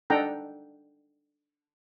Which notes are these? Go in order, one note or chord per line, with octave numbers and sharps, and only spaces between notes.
D4 D#4 A4 F#5 G5 A#5